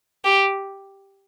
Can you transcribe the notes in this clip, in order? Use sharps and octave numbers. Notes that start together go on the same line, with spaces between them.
G4